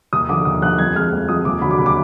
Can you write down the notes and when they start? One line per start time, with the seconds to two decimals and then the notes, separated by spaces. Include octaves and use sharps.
0.13 D#2 D#6
0.29 D3 F3 D6
0.45 D#2 D#6
0.62 D3 F3 F#6
0.78 F2 G#6
0.95 F3 G#3 F6
1.12 F2
1.28 F3 G#3 D#6
1.45 D#2 D6
1.61 D3 F#3 B5
1.71 D6
1.78 D#2 B5
1.86 D6